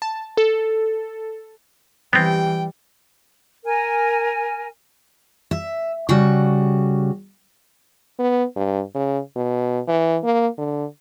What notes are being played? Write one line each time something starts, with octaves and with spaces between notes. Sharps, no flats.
A5
A4
E3 G3 B3 C4 G5
A#4 G#5
E5
C#3 G3 F#4
B3
G2
C#3
B2
E3
A#3
D3